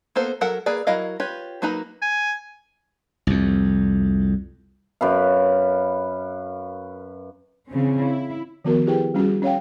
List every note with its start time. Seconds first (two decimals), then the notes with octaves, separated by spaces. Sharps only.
0.16 A#3 B3 A4 C5
0.41 F#3 A4 A#4 F#5
0.66 A#3 G#4 B4 D5
0.87 F#3 E4 A#4 D#5 F5
1.20 F4 G4 B4 C#5
1.62 F#3 A#3 D#4 B4 A#5
2.02 G#5
3.27 C2 F2
5.01 F#2 B4 F5
7.68 C#3 E3 C4 C#4
8.03 E4
8.65 D#3 F3 B3 F#4 A#4
8.87 E4 G4 G#4 B4 G5
9.14 G3 C#4 F#4 G#4
9.42 C#4 C#5 F5 G5